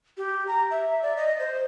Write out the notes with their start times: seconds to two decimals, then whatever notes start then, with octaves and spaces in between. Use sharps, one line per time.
0.17 G4
0.48 A#5
0.71 E5
1.03 D5
1.17 D#5
1.39 C5